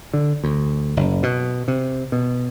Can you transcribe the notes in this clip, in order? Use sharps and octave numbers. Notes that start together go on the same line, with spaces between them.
D3
D2
F#1
B2
C3
B2